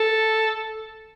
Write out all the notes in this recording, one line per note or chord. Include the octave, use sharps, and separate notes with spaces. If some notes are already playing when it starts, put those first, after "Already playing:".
Already playing: A4